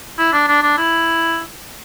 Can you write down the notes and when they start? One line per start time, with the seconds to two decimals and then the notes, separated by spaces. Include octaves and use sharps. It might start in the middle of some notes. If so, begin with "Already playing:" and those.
0.19 E4
0.33 D4
0.48 D4
0.63 D4
0.78 E4